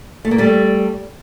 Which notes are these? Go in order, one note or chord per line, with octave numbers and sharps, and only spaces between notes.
A3
A#3
G3 A3